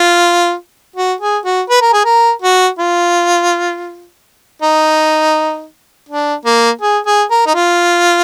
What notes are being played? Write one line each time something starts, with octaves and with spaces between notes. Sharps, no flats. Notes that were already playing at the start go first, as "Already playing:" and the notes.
Already playing: F4
F#4
G#4
F#4
B4
A#4
G#4
A#4
F#4
F4
D#4
D4
A#3
G#4
G#4
A#4
D#4
F4